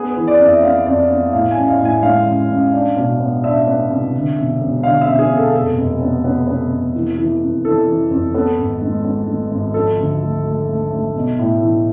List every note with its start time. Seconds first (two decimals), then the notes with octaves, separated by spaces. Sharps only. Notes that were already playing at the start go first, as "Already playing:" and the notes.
Already playing: B3 G#4
0.10 B4
0.17 E3
0.27 D5
0.39 F2
0.46 E5
0.63 B3 F5
0.86 F2 D5
1.10 B3
1.33 A2 F5
1.51 A1 G#5
1.67 F5
1.80 A2 G#5
2.02 G#3 F5
2.26 A1
2.49 A1
2.73 D4
2.96 B2
3.20 B3
3.43 D4 E5
3.67 B3
3.90 C2
4.14 D3
4.38 E1
4.61 E1
4.83 D3 F5
5.01 E5
5.07 E1
5.19 G#4
5.30 E1
5.37 A4
5.53 F1 A4
5.77 F1
6.01 B3
6.24 B3
6.47 B3
6.70 F1
6.95 E3
7.17 E3
7.41 F2
7.65 E3 A4
7.87 E3
8.11 F2
8.34 B3 A4
8.58 G#1
8.82 G#3
9.04 B3
9.27 G#3
9.51 G#1
9.74 F3 A4
9.98 D2
10.21 A3
10.45 A3
10.68 A3
10.91 A3
11.15 B1
11.39 A2
11.62 E3